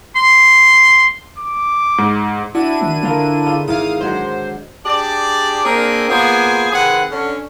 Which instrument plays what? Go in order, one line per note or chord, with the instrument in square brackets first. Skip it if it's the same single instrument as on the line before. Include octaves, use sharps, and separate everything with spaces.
[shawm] C6
[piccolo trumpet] D6
[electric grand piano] G#2
[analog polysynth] D4 E4 D#7 [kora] F#4
[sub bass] D#3
[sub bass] D3 [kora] C4 F4 A#4
[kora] C#3 F4
[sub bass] G#1 [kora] G#2 E3 F4 [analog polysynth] F5 D#6
[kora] D3 F#3 G#3 [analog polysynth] C5
[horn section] D4 G4 G#4 D5
A#3 C4 D4 G#4 A#4
A#3 B3 F4 G#4 C5 G#5
C3 D#3 C4 G#4 B4 F#5
D3 C#4